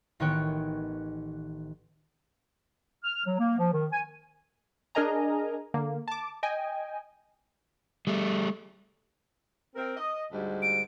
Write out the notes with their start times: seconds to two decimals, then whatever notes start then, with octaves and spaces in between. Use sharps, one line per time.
0.20 A1 D#3 B3 C#5 G5 F#6
3.04 F6
3.26 F#3
3.39 A#3
3.59 F3
3.72 D#3
3.93 G#5
4.95 D4 G#4 A#4 D#5 G#5 A#5
5.74 D3 A#3
6.08 A5 D6
6.43 D#5 G5 G#5
8.07 G3 A3
9.75 C4 A#4
9.96 D#5
10.32 D2 G#2 G3
10.62 D7